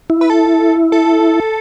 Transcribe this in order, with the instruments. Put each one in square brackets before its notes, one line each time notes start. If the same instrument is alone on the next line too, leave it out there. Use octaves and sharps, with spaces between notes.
[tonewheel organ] E4
[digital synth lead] B4
A4
A4